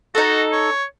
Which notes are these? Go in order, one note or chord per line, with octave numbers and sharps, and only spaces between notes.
D#4 F#4 A4
C#5